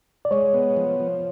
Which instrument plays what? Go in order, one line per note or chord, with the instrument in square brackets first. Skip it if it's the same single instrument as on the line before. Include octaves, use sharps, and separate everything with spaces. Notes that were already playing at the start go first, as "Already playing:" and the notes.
[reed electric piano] D5
[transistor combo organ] G#3 [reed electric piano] C#5
[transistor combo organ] B3
F3
F3